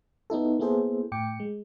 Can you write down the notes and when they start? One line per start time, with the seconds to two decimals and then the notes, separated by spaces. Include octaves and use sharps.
0.30 B3 D#4 E4 A4
0.59 A#3 B3 E4 G#4 A4 C5
1.12 A2 G5 D6 C#7
1.40 G#3